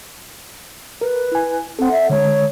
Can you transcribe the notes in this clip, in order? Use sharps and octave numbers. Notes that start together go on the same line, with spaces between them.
A#4 B4
E4 G#5
C4 A4 F#5
E5
D3 G#3 C#5